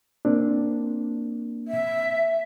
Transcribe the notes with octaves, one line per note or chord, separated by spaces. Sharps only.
A#3 C4 D4
E5